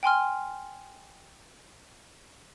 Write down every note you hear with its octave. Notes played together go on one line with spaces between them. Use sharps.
G5 G#5 C6 F6